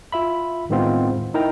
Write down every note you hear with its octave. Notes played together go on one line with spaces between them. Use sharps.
F4 E5 B5
A2 D#3 G#3 B3 C4 F4
D#4 E4 A#4 G5 A#5